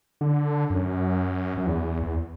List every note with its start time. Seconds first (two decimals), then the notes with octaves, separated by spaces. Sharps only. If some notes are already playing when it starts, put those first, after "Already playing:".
0.21 D3
0.70 F#2
1.58 F#2
1.67 E2
2.03 E2